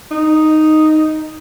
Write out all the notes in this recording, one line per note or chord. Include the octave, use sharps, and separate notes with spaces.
D#4